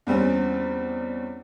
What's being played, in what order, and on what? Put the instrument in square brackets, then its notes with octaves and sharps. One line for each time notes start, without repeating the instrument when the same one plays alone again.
[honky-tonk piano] E2 G3 C4 C#4